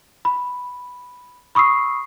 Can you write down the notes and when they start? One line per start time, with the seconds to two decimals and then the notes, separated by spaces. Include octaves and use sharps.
0.25 B5
1.55 B5 C#6 D#6 E6 C7